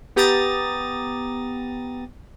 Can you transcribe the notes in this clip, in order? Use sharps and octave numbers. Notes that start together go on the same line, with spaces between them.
B3 G4 A#5 D#6 A6